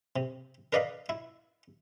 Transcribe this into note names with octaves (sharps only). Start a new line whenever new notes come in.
C3
A#4 B4 D5 D#5 F5 B5
E4